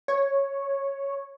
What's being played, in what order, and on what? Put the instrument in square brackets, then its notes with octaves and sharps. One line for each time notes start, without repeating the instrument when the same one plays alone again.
[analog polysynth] C#5